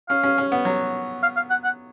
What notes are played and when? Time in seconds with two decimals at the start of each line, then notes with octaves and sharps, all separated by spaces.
0.09 C#4 F5
0.23 C#4
0.38 C#4
0.52 B3
0.65 F#3
1.23 F5
1.36 F5
1.50 F#5
1.64 F#5